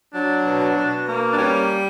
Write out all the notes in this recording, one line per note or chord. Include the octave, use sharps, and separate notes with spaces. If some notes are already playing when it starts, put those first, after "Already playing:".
F#3 D4
B2
B2
A#3
D4
G3 C#4